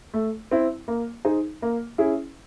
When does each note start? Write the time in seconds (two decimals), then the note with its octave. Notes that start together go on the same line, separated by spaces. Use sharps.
0.14 A3
0.51 C4 E4
0.88 A#3
1.25 D#4 G#4 C5
1.62 A#3
1.98 C#4 E4 G#4